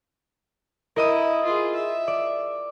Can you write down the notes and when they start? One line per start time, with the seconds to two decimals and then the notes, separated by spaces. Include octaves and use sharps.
0.96 E4 A#4 D#5 D#6
1.45 F4 G#4
1.75 E5
2.08 D5